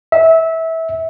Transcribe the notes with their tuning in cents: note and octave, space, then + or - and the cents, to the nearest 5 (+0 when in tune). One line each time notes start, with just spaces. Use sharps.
E5 -20